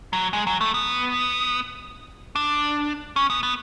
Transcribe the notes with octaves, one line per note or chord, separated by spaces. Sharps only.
F#3
G#3
F#3
A3
B3
D4
C#4
B3
B3